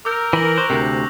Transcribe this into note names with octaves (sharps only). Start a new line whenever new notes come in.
A#4 D6 E6 G6
E3 A#6 F#7
C5 C#6 D6 F#6
D2 C3